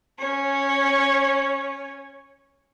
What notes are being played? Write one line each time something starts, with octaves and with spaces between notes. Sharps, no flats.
C#4 C#5